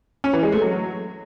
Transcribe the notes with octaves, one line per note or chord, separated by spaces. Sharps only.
C#4
E3
G#3
A3
F#3